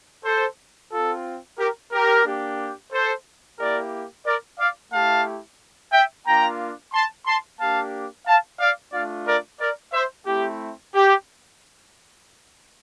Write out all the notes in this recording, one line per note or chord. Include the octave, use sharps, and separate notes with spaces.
A4 C5
C4 F4 A4
G4 A#4
G4 A#4
A#3 D4 G4
A4 C5
A#3 E4 G4 A#4 D5
A#4 D5
D5 F5
A3 E4 G4 F5 A5
E5 G5
A#3 D4 F4 G5 A#5
A5 C6
A5 C6
A#3 D4 G4 F5 A5
F5 A5
D5 F5
A3 D4 F4 D5 F5
A#4 D5
A#4 D5
C5 E5
A3 C4 E4 G4
G4